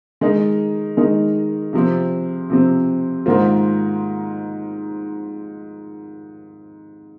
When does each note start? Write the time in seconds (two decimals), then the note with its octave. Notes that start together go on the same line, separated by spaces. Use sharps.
0.21 D#3 G#3 D#4 A#4
0.97 D#3 G#3 D#4 A#4
1.73 C3 F3 C4
2.50 C3 F3 C4
3.26 G#2 D#3 A#3 F4 C5